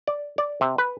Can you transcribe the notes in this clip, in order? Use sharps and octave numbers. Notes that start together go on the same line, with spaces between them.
D5
D5
C3
B4